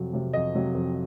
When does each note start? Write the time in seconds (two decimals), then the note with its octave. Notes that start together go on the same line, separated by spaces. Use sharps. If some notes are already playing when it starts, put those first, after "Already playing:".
Already playing: F2 C3 F#3
0.13 C3 F#3
0.33 F2 D#5
0.54 C3 F#3
0.75 F2